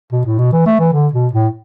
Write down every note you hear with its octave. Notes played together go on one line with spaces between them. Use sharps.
B2
A2
B2
E3
A3
E3
D3
B2
A2